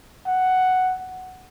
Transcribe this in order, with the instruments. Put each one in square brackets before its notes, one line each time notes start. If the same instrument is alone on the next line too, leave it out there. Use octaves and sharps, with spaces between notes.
[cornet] F#5